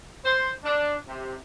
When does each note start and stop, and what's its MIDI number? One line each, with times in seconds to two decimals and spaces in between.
0.24 0.49 72
0.64 0.94 62
1.07 1.35 48